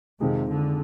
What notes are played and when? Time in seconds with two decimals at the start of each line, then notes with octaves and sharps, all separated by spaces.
0.21 F2 C3 D#3 G#3 C4 F4
0.50 D3